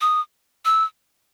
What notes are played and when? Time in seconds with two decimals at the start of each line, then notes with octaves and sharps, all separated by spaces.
0.01 D#6
0.65 E6